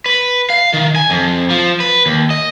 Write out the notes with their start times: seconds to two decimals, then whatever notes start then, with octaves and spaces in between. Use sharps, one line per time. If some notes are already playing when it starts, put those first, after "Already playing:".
0.06 B4
0.50 F5
0.73 D#3
0.96 G#5
1.10 F2
1.50 F3
1.80 B4
2.06 D#2
2.30 D#5